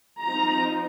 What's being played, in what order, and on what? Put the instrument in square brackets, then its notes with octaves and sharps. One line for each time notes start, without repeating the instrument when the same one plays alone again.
[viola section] F3 C4 D#4 A#5